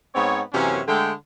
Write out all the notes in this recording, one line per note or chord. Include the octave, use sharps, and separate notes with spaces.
G#2 B3 C4 C#5
F#2 C3 E3 A#3 C#4
D3 G#3 A3 G5